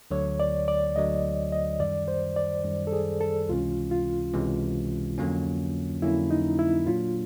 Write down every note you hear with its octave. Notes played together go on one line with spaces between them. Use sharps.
D2 D3 F#3 C#5
D5
D5
D2 D3 F#3 D#5
D#5
F#2 D#3 G3 D5
C5
D5
F#2 D#3 G3
A4
G#4
A4
C#2 C3 E3 G#3 C#4 F4
F4
C#2 C3 E3 G#3 C#4
F2 D3 F#3 A#3 C#4
F2 D3 F#3 A#3 C#4 E4
D#4
E4
A#2 F#3 A#3 D4 F4